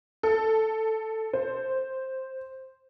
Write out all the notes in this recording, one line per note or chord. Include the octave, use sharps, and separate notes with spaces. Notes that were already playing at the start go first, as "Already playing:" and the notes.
A4
C5